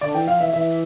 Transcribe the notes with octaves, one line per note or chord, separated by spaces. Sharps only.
D3 D5
E3 G5
F3 F5
E3 E5
E3 E5